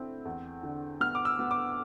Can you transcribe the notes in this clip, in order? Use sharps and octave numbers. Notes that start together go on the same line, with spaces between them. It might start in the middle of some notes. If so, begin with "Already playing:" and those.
Already playing: D3 A3 C4 E4
E2
D3
B3 F6
D6
E6
B3
D6